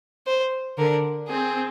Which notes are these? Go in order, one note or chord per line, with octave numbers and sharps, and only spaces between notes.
C5
D3 D4 A#4
C4 G#4